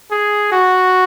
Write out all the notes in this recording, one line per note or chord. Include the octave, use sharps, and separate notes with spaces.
G#4
F#4